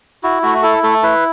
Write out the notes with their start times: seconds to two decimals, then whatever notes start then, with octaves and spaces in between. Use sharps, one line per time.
0.23 E4 F#4
0.43 A3 F#4
0.63 E4 A4
0.83 A3 A4
1.03 E4 B4